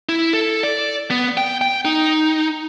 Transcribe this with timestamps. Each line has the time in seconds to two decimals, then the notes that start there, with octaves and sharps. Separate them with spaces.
0.09 E4
0.33 A4
0.63 D5
1.11 B3
1.37 G5
1.61 G5
1.85 D#4